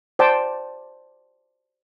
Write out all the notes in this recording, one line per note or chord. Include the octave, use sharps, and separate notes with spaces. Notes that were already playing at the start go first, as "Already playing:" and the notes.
C5 D5 G5 A5